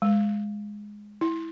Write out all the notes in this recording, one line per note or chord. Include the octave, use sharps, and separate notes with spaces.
G#3
E4